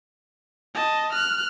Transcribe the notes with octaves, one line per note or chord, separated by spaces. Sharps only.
D#5 A5
F6 F#6